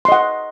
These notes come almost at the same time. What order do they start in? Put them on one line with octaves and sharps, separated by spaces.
C6 D#5 F#5